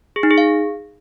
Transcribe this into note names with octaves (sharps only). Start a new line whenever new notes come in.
G#4
D#4
G#4
F5